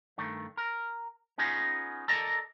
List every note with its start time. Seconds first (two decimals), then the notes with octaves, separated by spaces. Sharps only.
0.18 G2 D#3 A3
0.57 A#4
1.38 B3 C#4 D#4 F4 G#4
2.08 A4 A#4 D5 D#5 A5 A#5